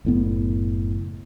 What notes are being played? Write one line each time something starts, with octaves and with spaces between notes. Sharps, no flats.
F#1 A2 B3